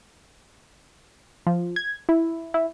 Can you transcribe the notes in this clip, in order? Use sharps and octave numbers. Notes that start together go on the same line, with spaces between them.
F3
G#6
E4
E4